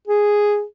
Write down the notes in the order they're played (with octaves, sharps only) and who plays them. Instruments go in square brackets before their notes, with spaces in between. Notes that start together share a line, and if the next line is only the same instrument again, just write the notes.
[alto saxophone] G#4